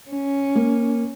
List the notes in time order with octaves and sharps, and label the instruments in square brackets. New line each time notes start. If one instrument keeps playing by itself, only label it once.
[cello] C#4
[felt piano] A#3